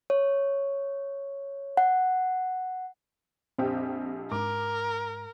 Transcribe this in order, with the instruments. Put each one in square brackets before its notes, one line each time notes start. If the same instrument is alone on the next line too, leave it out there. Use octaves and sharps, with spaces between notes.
[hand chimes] C#5
F#5
[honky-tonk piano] A#1 F2 G4 [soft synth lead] C4
[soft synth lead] G#2 [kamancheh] A#4 [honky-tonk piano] D6